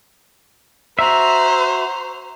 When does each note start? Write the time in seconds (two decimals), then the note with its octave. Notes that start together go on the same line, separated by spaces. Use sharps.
0.99 F#4 C5 E5 A#5